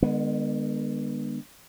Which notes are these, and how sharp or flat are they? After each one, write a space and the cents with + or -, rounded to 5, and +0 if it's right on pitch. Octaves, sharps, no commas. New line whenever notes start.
D3 +30 G#3 -30 B3 -20